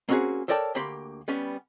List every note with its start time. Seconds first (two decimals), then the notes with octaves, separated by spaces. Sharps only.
0.09 A#3 C4 C#4 F4 F#4 G#4
0.48 A4 A#4 C#5 D5 G5 A5
0.75 D2 A#3 G4 F5 B5 C6
1.28 G3 B3 C#4